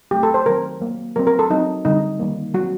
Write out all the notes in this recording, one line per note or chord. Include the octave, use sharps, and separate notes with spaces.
F#3 A3 C4 G4
A4
C5
D#3 F#3 C4 A#4
F#3 A#3
F#3 C4 A#4
A#4
A4
F#3 C4 D#4
D3 G3 C4 D#4
D#3 G3 A#3
F#3 C4 F#4